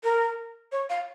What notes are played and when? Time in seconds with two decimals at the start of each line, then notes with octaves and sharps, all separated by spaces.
0.04 A#4
0.72 C#5
0.89 F5